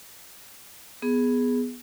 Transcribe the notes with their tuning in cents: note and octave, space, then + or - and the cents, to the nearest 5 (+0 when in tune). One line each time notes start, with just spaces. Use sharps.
B3 +0 G#4 +0